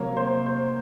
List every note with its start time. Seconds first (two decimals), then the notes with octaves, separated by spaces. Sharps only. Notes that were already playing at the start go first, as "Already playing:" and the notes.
Already playing: C3 F#3 A#3 C#5
0.17 C5
0.46 C5